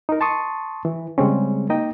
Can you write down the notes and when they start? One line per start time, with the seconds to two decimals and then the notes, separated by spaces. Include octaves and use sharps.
0.09 D#4 A#4
0.21 A5 C6 C#6 D#6
0.85 E3
1.18 C#3 G3 G#3 C4 C#4
1.69 A#3 D#4 D#5 G5